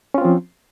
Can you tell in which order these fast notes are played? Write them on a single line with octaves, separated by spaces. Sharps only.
C#4 F4 C4 F3